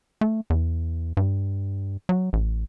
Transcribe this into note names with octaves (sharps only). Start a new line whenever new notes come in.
A3
E2
G2
F#3
A1